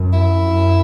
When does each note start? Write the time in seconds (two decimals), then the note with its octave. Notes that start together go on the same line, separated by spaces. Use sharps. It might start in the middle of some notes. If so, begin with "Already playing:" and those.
Already playing: F#2
0.13 E4
0.42 F#2